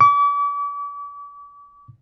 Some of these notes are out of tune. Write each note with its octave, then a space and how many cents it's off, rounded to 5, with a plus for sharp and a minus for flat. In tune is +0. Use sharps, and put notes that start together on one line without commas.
D6 -40